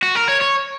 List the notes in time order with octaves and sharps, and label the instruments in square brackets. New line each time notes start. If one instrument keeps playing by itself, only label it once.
[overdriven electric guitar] F#4
A#4
C#5
C#5